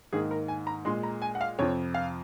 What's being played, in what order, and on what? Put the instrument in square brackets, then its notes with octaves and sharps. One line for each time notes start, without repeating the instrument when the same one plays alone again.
[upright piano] G#2 D#3 A#3 G#4
A#4
G#5
A#5
A#2 G#3 C6
A#5
G#5
F#5
F5
F2 C3 F3 C#5
F5